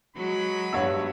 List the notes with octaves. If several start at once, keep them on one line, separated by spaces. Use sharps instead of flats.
F#3 G#3 F#4 B5
G2 B3 C#5 F#5 E6